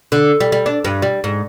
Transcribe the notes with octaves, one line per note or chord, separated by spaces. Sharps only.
D3
G3
G3
D4
G2
G3
G#2